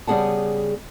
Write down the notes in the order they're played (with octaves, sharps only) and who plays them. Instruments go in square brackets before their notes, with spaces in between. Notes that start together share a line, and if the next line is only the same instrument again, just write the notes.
[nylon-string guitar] C#3 G3 B3 G#4 F#5 A5